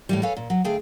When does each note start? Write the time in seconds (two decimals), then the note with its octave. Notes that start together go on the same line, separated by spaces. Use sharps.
0.09 A2 E3 G3
0.23 A4 B4 C#5 F5 G#5
0.37 A#2
0.50 F#3
0.64 D2 A3 G#4 F5 G5